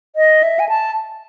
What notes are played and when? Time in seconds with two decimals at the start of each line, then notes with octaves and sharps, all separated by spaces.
0.16 D#5
0.43 E5
0.59 G#5
0.69 A5